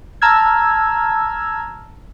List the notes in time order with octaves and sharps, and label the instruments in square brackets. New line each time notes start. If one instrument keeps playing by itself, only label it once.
[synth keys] A5 A#5 E6 F6 G#6